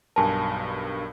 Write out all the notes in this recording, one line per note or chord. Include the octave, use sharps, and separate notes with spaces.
B1 G2 A#4 G#5 A5